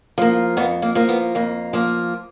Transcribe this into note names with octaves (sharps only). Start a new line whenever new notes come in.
F3 A#3
F2 B3
A#3
F3 A#3
B3
F2 A#3
F3 A#3